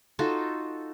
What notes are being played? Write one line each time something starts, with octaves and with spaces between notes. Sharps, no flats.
D#4 F4 F#4 A4